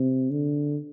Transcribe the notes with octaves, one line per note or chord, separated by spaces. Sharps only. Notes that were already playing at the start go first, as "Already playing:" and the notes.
Already playing: C3
D3